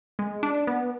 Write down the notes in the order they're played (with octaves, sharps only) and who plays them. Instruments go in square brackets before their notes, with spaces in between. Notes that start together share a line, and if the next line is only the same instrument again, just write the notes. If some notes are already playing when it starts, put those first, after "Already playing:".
[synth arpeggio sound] G#3
D4
B3